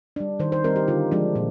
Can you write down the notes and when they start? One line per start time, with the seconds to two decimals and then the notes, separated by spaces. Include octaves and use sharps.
0.16 G3 D4
0.40 D#3 C5
0.52 C5
0.64 G3 C4 D#4 A#4
0.76 G4
0.88 D3 F4
1.12 F3 G#3 D4
1.35 A#2